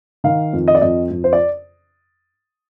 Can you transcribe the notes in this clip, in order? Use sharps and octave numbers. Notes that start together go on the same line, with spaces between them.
D#3 F5
F2
D#5
D5
F2 D#5
F2
C5
D5